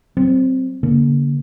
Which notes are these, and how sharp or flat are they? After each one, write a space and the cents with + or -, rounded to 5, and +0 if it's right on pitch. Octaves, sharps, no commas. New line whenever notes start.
F#3 +35 C4 +0
D3 -45 A#3 +15